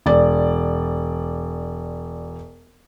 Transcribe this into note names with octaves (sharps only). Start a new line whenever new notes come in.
E1 D5